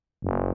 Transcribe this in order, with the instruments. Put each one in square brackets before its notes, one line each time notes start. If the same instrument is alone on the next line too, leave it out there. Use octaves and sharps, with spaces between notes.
[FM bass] F#1